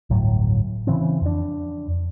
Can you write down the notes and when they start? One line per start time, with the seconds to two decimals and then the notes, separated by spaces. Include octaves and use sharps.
0.10 G1 D2 A2 F#3
0.87 C#3 E3 C4
1.21 F2 D4